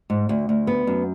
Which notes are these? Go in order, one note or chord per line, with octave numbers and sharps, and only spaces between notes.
G#2
D2
D2
B3
F#2